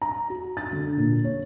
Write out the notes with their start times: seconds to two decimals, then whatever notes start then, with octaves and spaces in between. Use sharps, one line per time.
0.02 A#5
0.30 F#4
0.57 A6
0.73 D3
0.97 A#2
1.24 C#5